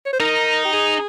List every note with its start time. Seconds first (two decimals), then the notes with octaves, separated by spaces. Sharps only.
0.06 C#5
0.13 C5
0.20 D#4 A#4
0.65 G4
0.73 G#4